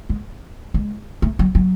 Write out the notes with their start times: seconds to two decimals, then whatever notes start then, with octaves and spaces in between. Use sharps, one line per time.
0.09 G#3
0.74 G#3
1.22 A3
1.39 F#3
1.55 F#3